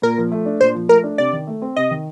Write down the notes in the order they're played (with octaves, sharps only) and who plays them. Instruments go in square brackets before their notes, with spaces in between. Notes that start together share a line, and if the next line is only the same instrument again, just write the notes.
[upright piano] A#2 [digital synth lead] A#4
[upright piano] F3
A3
D4
[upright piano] A#2 [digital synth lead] C5
[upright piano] F3
[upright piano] A3 [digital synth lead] A#4
[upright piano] D4
[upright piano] C3 [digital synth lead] D5
[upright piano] D#3
A3
C4
[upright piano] C3 [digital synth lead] D#5
[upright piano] D#3